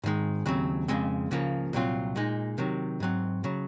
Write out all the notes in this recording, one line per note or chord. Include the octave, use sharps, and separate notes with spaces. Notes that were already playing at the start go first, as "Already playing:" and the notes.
G#2 D#3 G#3
D#2 C#3 F#3 C4
F2 C#3 G#3 C4
C#2 C#3 F3 A#3
C2 A#2 F#3 C4 F4
A#2 G#3 D#4
C3 D#3 F#3
G#2 F#3 C4
C#3 F#3